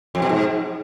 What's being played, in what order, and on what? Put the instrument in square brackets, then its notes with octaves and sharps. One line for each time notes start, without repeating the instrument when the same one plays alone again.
[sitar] F2
B2
G#2